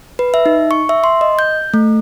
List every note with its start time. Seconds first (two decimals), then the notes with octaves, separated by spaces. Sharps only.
0.19 B4
0.34 E5
0.46 D#4
0.71 C#6
0.89 E5
1.04 C6
1.21 D#5
1.39 G6
1.74 A3